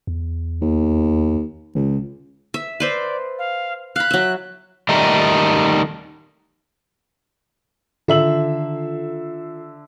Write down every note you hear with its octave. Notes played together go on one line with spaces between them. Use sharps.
E2
D#2
C#2 C#3
E5
B4 C5 D5 E5
F5
F5 B5 F#6
F#3 E5
D#3 G3 A3 D#4
D3 D#3 F4 A4 E5 F#7